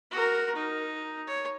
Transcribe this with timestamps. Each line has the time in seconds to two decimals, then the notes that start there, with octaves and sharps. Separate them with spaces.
0.11 F#4 A#4
0.55 D#4
1.27 C#5